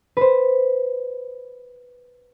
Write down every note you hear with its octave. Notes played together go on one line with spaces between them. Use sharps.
B4 C5